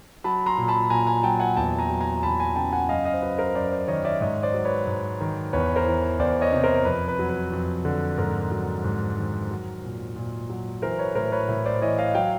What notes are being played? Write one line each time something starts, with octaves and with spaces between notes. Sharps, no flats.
F#3 A5 B5
A#5 C6
A#2
A5 B5
A#2 G#5 A#5
G#5 A#5
F#3 G5 A5
F#5 G#5
E2 G5 A5
G#5 A#5
F#3
G#5 A#5
E2 A5 B5
G#5 A#5
C#3 G5 A5
F#5 G#5
F#2 D#5 F5
D#5 F5
C5
F#3 B4
A#4 C5
F#2 C5 D5
C5 D5
D#3 C#5 D#5
D5 E5
G#2 C#5 D#5
C5 D5
F#3
B4 C#5
G#2
D#3
E2 B4 C#5
A#4 C5
E3
E2 C5 D5
C#5 D#5
C3
A#4 C5
F2 B4
B4
F#3
B4
F2
D3
G#2 A#4
F#3
G#2
D#3
F#3
A#2
A#2
F#3
E3 A#4 C5
B4 C#5
A2 A#4 C5
B4 C#5
A2
C5 D5
E3 C#5 D#5
D#5 F5
F#3 F5 G5